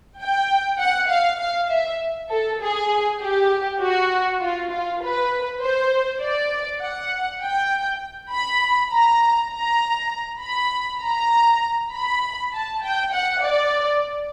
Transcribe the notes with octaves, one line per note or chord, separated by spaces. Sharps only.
G5
F#5
F5
F5
E5
A4
G#4
G4
F#4
F4
F4
B4
C5
D5
F#5
G5
B5
A#5
A#5
B5
A#5
B5
A5
G5
F#5
D5